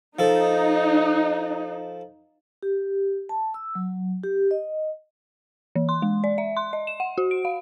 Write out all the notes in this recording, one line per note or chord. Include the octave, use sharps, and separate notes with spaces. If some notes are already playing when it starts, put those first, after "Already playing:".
F3 D#4 A4
G4
A5
E6
F#3
G4
D#5
E3
C6
G#3
D5
E5
C6
D#5
E7
F#5
F#4
D7
F5